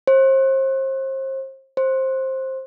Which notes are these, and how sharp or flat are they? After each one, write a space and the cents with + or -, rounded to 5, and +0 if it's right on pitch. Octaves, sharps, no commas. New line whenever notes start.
C5 +35
C5 +15